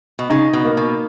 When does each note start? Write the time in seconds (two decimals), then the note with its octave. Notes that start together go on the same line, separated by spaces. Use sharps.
0.19 B2
0.30 C#3 D#4
0.53 B2
0.65 A#3
0.77 B2